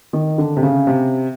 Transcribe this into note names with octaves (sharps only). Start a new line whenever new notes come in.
D#3
D3
C3
C#3
C3